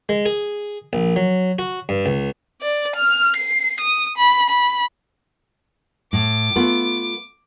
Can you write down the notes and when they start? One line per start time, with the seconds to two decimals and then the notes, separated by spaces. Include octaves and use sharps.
0.09 G#3
0.26 G#4
0.93 A#1
1.16 F#3
1.59 F#4
1.89 G2
2.06 C#2
2.62 D5
2.96 F6
3.36 C7
3.80 D#6
4.18 B5
4.50 B5
6.13 A2 D6
6.56 A3 B3 F4